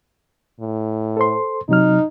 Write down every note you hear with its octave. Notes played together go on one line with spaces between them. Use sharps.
A2
A4 C5 C6
C3 F#3 D#4 F6